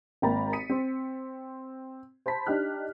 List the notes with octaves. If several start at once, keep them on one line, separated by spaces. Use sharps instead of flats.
G#1 A#3 G5 A#5 B5 A6
D#6 B6 C#7 D#7
C4
C5 A5 B5 B6
D4 D#4 G4 F6 F#6